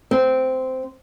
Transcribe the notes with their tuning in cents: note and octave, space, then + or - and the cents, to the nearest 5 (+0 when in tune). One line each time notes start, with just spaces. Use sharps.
C4 -10